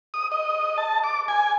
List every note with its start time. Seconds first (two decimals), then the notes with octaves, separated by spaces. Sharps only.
0.14 D#6
0.32 D#5
0.78 A5
1.04 D6
1.28 G#5